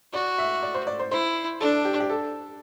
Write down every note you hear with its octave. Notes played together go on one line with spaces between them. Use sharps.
F#4 D5
E5
D5
C5
D5
C5
E4 C5
D4 A4
G4
G4
A4